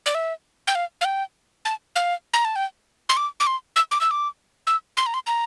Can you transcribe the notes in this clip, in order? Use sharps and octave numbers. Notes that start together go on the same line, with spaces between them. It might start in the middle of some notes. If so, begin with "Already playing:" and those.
D5
E5
G5
F5
F5
G5
A5
F5
A#5
A5
G5
C6
D6
D6
C6
E6
D6
E6
D6
E6
C6
A#5
C6
A#5